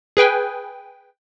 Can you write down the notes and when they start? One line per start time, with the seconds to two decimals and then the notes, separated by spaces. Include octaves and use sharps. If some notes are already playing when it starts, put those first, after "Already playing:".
0.17 G#4 B4 G5 G#5